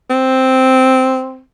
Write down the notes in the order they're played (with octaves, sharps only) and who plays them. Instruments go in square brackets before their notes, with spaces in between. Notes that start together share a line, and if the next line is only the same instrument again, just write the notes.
[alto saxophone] C4